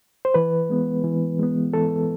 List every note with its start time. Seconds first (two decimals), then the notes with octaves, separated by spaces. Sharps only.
0.25 C5
0.34 E3 B4
0.70 G#3 B3
1.04 E3
1.39 G#3 B3
1.74 E3 A4